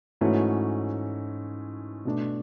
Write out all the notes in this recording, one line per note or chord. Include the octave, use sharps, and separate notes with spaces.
G#2 E3 A3 C#4 F#4
B2 A3 D4